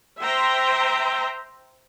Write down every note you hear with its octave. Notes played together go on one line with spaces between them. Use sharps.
C5 E5 G5 A#5 C6